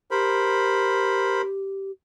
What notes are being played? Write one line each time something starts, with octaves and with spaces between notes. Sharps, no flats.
G4 A#4 C5 B5